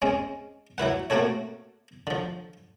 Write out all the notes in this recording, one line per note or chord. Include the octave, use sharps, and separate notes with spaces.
G#3 C4 C#4
F#3 E4 B4 F#5
A3 A#3 C4 F#4 A4 C#5
D3 F3